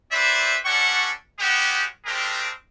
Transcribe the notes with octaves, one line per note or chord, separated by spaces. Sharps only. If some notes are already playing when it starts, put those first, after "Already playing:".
E4 G4 B4 C5 D5 E5
G3 C#4 D4 A4 F#5 C#6
G#3 B3 C#4 F#4 G4
G#3 A3 C4 D4 G4 A#4